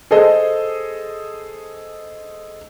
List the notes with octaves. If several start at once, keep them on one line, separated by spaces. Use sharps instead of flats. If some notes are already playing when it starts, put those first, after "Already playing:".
G#4 A4 C5 D#5